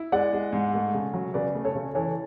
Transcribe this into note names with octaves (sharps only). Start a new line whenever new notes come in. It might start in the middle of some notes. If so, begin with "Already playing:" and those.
Already playing: E4
G#3 D5 F#5
G#3
G#2
A3
C#3
F#3
C#3 B4 D5
A3
A4 C#5
C#3
E3 A4 C#5